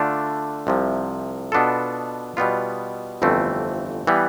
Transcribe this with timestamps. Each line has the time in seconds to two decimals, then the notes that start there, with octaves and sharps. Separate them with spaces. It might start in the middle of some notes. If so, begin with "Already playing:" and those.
Already playing: D3 A3 D4 F4
0.67 C2 C3 F3
1.52 B2 B3 D4 F4 A4
2.37 B2 G3 B3 F4
3.22 G1 F2 E3 A3 C4
4.07 E3 G3 B3